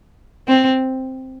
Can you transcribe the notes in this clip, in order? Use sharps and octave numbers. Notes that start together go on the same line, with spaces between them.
C4